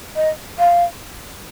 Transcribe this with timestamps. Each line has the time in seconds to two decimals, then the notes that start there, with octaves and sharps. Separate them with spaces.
0.16 D#5
0.59 F5